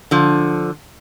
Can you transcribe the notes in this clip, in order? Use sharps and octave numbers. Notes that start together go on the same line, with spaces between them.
D3 F3